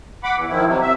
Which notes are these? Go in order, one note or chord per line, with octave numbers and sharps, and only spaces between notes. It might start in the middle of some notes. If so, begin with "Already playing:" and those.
F#5 B5 D6
E2 E3
D#3 F3 E4
C3 F#3
C3 E5